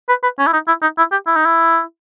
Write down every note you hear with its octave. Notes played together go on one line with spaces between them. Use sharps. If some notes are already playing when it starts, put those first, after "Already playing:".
B4
B4
C#4
E4
D#4
E4
D#4
E4
G4
E4
D#4
E4